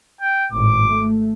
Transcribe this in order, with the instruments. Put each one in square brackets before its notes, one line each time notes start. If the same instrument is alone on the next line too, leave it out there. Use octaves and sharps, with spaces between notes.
[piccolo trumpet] G5
[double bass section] G#1 A2 [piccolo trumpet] D6
[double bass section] A3